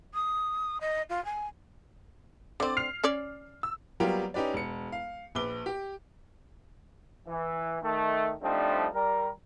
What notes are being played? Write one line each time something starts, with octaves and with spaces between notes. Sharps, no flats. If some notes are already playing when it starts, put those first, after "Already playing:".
D#6
D#5
F4
G#5
D3 C4 D5
F6 C7 F7
C#4 C#5 D5
E6
F#3 G3 A#3 B3 F4 G4
C#4 D#4 G4 B4 D5
E1 C#7
F5
A#1 B4 D6 G7
G4
E3
D#3 A3
F3 G3 A3 C4 D4 D#4
G3 A#4